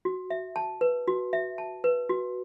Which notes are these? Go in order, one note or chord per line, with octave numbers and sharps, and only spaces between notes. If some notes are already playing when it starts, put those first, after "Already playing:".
F#4
E5
A5
B4
F#4
E5
A5
B4
F#4